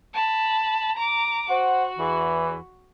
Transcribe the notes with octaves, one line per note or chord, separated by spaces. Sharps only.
A5 B5
A#5 D6
F#4 C5 F#5
E2 E3